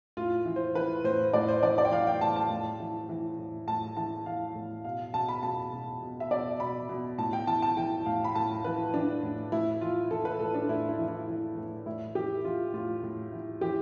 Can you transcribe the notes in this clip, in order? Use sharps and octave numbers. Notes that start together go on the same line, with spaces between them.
A2 F4
E3
C5
E3 B4
A2 C5
A2 D5
C5
E3 D5
D5
G5
E3 F5
G5
A2 A5
A5
A2
E3
E3
A2
A2 A5
E3 A5
E3 F5
A2
B2 F5
B2 A5
B5
B2 A5
B2
B2
E5
B2 D5
B2 B5
B2
A2 A5
G5
E3 A5
A5
E3 G5
A2 F5
B5
A2 A5
E3 B4
E3 D4
A2
A2 E4
E3 F4
E3 A4
B4
A2 A4
D4
A2 E4
E4
E3
E4
E3
A2
A2 E4
E3 G4
E3 F4
A2 F4
A2
E3
E3 G4